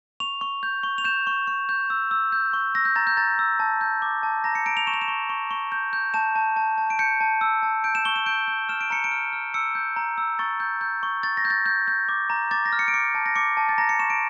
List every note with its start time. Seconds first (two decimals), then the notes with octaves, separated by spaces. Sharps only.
0.20 C#6 F7
0.41 C#6
0.63 G6
0.83 C#6
0.98 F7
1.04 G6 E7
1.27 C#6
1.47 C#6
1.69 G6
1.90 E6
2.11 E6
2.32 G6
2.53 C#6
2.75 E6 A#6
2.85 G6
2.96 A#5 A6
3.07 G6
3.17 A#5 A6
3.39 E6
3.60 A5
3.81 G6
4.02 D6
4.23 A5
4.44 A#5 A#6
4.55 C#7
4.66 A#5 D7
4.77 F7
4.87 C#6 E7
4.94 F7
5.02 E7
5.08 C#6
5.29 C#6
5.51 C#6
5.72 G6
5.93 G6
6.14 A5 E7
6.35 A5
6.56 A5
6.78 A5
6.90 D7
6.99 G6 C#7
7.21 A5
7.41 E6
7.63 A5
7.84 G6 D7
7.95 E7
8.05 C#6 G7
8.16 E7
8.26 G6 D7
8.48 G6
8.69 F6 E7
8.81 D7
8.90 A#5 C#7
9.04 D7
9.12 F6
9.33 F6
9.54 E6 C#7
9.75 G6
9.96 A#5
10.18 E6
10.39 C#6 A6
10.60 G6
10.81 G6
11.03 C#6
11.23 C#6 A6
11.37 A#6
11.45 G6
11.50 A6
11.66 G6
11.88 G6
12.09 D6
12.30 A#5
12.51 D6 A6
12.66 A#6
12.73 F6
12.79 C#7
12.88 D7
12.94 D6 C#7
13.15 A5
13.26 A#6
13.36 D6 C#7
13.57 A5
13.69 A6
13.78 A#5 A#6
13.89 C#7
13.99 C#6 E7
14.10 D7